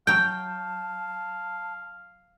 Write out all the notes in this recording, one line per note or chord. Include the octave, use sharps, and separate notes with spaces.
F#3 F5 G5 A5 G6